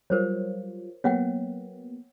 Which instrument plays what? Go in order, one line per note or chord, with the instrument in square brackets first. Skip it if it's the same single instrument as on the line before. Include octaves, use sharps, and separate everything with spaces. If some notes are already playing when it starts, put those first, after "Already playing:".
[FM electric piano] F#3 G3 F4 [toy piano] A#4 C5 C#5
[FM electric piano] F#3 A#3 B3 [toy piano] C#5 F#5 G5